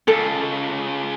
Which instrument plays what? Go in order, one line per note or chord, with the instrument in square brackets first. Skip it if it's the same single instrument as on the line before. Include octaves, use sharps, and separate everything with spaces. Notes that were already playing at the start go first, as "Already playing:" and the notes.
[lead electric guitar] C#2 C#3 [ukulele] A4